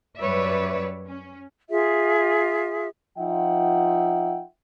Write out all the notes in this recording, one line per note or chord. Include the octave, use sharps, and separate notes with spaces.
F#2 G3 B4 C#5 D5 E5
C#4
F4 G#4 E5
F3 D#4 F4 E5 F#5 G5